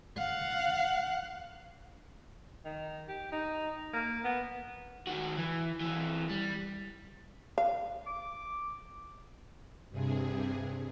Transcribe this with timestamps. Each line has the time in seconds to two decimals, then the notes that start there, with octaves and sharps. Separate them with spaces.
0.18 F5 F#5
2.65 D#3
3.08 G4
3.32 D#4
3.94 A#3
4.24 B3
5.07 D#3 F#4
5.38 E3
5.80 E3 C4
6.29 G3
7.58 F5
8.06 D6
9.90 G2 C3 G#4